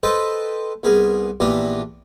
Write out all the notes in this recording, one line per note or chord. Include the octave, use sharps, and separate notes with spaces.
A4 B4 C5 D#5 G5 A5
C2 B3 G#4 A#4
A#1 E3 B3 D4 G4 A#5